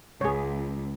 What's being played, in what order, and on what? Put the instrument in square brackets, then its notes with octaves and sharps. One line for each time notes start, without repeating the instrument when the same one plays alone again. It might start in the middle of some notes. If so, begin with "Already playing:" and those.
[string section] C#2 [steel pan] G#4 C#5